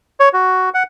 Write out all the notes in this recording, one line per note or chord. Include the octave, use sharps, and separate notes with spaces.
C#5
F#4
F#5